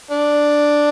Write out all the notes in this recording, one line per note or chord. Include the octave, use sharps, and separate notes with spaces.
D4